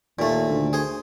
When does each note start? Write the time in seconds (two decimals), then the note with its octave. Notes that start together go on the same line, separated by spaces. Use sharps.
0.19 D#2 A#2 A3
0.50 D2
0.73 G#4 C5